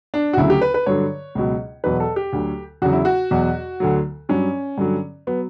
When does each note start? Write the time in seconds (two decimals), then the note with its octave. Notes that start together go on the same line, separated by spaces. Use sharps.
0.14 D4
0.33 F#4
0.37 D2 C#3 F#3 E4
0.50 G4
0.62 B4
0.74 B4
0.86 G2 D3 F#3 C#5
1.35 C#2 B2 F#3
1.84 E2 B2 F#3 B4
2.00 A4
2.16 G4
2.33 D2 D3 F#3
2.82 E2 C#3 F#3 F#4
2.93 E4
3.05 F#4
3.31 E2 B2 F#3
3.80 D2 D3 F#3
4.29 G2 F#3 C#4
4.78 G2 D3 F#3
5.27 F#3 B3